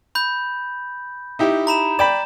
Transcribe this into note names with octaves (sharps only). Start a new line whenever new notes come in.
B5 G6
D#4 E4 G4
A#5 B5 E7
D5 G5 B5 E7